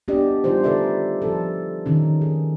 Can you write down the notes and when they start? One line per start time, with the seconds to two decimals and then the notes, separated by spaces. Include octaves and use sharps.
0.08 B3 D4 G4 D5 D#5
0.44 G3 D#4 F4 G4 C5
0.63 D3 D#4 A4 B4 D5 E5
1.22 F3 A4
1.86 D#3 C#4 D#4
2.21 G#4